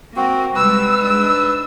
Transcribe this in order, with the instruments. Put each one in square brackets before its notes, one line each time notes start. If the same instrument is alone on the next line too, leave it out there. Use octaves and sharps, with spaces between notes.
[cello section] A#3 [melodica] C4 F#4
[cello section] C3 G3 G#3 [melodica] B4 [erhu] E6
[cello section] G#2 D4 [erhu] E6